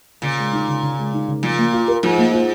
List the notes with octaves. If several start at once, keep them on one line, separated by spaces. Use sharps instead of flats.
A#2 C#3
G#3
D#4
C#3
C#3
G#3
D#4
C#3
A#2 F3
A#3
F4
A#4
G#2 F3
A#3
F4